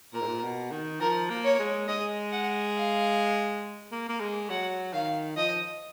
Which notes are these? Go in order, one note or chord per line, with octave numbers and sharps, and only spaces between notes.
A#2 A#4
G#2
A#2
B2
D#3
F3 A#4
A#3
C#5
G#3
G#3 D#5
F#5
F5
A#3
A#3
G#3
F#3 F#5
D#3 F5
F3 D#5